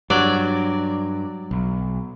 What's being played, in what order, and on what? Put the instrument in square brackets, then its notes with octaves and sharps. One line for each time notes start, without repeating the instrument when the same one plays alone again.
[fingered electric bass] G2 [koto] F#3 D5
[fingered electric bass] B1